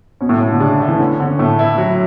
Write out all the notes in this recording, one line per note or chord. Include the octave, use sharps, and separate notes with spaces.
B2 C#4
A2
B2 A3
D3
C#3 D4
A3
E3
D3 C#4
D3 C#4
A2 A3
E4
F#3